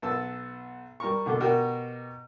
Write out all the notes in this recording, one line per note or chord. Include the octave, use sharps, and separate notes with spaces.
B1 B3 A5 E6
G3 A#4 A#5 C#6
B2 D3 A3 A#3
B2 F#4 G4 A#4